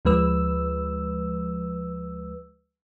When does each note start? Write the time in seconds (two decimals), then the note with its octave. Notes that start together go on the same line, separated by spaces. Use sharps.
0.05 D2 F3 G#3 B4 E6